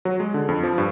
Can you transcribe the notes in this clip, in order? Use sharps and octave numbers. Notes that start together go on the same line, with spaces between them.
F#3
G#3
D3
F2
F3
G2